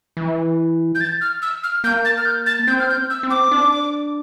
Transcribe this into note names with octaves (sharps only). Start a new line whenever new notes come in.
E3
G6
A6
F6
E6
F6
A#3 G6
A6
F6
G6
A6
C4 G6
F6
G6
E6
C4
D6
D4